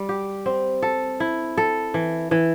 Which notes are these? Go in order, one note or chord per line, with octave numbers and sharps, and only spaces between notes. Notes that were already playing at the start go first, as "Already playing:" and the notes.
Already playing: G3
G4
C4
A4
E4
A4
E3
E3